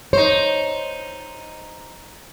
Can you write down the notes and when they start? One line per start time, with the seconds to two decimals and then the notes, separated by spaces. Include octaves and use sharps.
0.13 D#4 C5 C#5